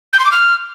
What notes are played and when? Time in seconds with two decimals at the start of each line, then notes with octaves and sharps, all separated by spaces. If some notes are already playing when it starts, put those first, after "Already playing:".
0.13 G6
0.19 C6
0.25 D6
0.31 F6